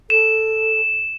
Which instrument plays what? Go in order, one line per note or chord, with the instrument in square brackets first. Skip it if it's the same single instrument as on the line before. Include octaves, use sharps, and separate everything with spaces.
[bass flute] A4 [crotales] E7